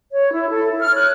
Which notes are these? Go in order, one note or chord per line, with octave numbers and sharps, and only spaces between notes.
C#5
E4
A4
E4
F6
C#5
F#6